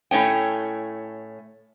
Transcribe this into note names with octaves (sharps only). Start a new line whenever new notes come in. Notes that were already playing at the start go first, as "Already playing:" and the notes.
A2 A3 C#4 G5